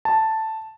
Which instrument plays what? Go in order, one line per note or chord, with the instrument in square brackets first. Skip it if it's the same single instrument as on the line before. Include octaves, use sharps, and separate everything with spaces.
[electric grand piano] A5